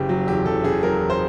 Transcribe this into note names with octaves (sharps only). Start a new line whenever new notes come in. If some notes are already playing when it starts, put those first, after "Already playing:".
Already playing: F#1 C#3 G4
F#3
E2 G4
F#1 A4
C#3 G#4
F#3 A#4
E2
C5